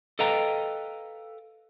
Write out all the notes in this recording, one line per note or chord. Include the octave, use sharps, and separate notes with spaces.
A4 B4 D#5 F5 G5 A#5